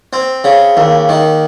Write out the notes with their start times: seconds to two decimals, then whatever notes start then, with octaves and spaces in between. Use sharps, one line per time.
0.13 C4
0.44 C#3
0.77 D#2
1.09 D#3